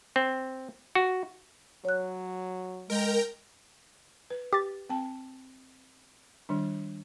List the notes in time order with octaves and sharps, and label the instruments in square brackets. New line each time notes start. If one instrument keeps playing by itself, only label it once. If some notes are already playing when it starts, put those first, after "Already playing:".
[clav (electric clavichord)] C4
F#4
[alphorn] F#3 [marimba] C#5 F#6
[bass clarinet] G#3 [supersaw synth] A#4 G5 A#5
[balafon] B4
[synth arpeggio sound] G4 A6
[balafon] C4 G5 A5
D#3 G3 D4